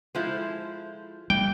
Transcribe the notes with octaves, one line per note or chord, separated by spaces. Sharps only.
F3 G#3 E4 A4 C5
E3 G3 A#3 G5